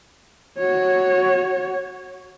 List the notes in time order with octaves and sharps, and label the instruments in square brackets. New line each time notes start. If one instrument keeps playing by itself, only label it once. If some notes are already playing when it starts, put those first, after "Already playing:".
[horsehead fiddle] F#4 C#5